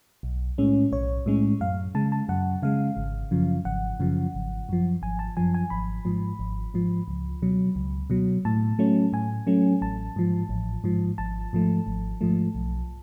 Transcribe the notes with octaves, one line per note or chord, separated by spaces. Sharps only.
B1
A2 G#3 C#4
B1 C#5
A2 G#3 C#4
F#2 F5
C#3 G#3 A5
A5
F#2 F#5
C#3 G#3 F5
G#1
F#2 C#3 F3
G#1 F#5
F#2 C#3 F3
G#1
F#2 F3
G#1 G#5
A5
F#2 F3 G#5
G#5
G#1 B5
G#2 F3
G#1
G#2 F3
C#2
B2 F#3
C#2
B2 F#3
A2 A5
F#3 A3 C#4
A2 G#5
F#3 A3 C#4
A1 A5
G#2 F3
A1
G#2 F3
G#1 A5
G#2 F3 A3
G#1
G#2 F3 A3
B1